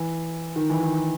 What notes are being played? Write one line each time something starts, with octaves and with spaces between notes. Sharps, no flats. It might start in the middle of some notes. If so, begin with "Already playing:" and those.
Already playing: E3
D#3
E3
D#3